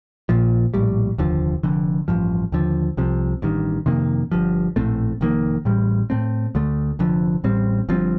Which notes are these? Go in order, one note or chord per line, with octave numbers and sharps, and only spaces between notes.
A#1 A#2 F3
A#1 A2 G3
F1 D#2 D3 F3
F1 F2 D3
A1 G2 F3
D#2 D3 F3
C2 C3 F3
A1 G2 D#3
F2 C3 D#3 A#3
G1 G2 F3
A#1 A2 A3 C4
F1 F2 D#3 A#3
A1 A2 G3
A2 A3 C4
D2 D3 A3
F1 F2 D3 F3
A1 A2 G3 C4
G1 G2 F3 C4